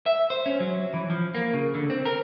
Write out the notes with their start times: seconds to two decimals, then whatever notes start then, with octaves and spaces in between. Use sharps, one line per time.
0.06 E5
0.30 C5
0.46 C#4
0.60 F#3
0.94 E3
1.10 F3
1.35 A#3
1.53 C#3
1.75 D3
1.90 C4
2.05 A#4